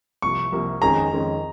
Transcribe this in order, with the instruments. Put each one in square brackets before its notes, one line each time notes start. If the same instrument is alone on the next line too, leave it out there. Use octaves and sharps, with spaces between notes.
[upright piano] C2 C3 F3 A#3 [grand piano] C#6
[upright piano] C2 C3 F3 A#3
[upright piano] F2 D#3 G#3 C#4 G#4 [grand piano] A#5
[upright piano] F2 D#3 G#3 C#4 G#4